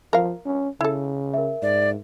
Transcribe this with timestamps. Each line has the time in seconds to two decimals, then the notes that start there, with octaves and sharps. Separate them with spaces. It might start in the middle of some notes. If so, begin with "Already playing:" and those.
0.13 F3 A#4 F5
0.45 C#4
0.81 C#3 E4 A4
1.34 A#4 E5
1.62 G#2 D5